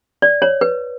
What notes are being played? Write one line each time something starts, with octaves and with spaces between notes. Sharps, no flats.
D5
C#5
B4